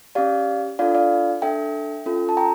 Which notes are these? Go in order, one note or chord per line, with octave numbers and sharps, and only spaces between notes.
C#4 G4 D5 F5
D4 F4 A4 D5 F5
D5 F5
D4 A4 E5 G5
C#4 F4 A4
A5
G5 A#5